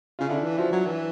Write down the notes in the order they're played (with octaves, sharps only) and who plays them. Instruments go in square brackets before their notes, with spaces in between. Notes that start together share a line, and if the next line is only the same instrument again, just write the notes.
[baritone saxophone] C#3 [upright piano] F4
[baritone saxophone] D3 [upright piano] D4 E4
[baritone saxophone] E3
[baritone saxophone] F3 [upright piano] E4 F#4
[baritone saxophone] F#3
E3